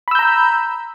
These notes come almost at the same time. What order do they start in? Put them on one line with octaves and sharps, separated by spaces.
B5 E6 G6 A#5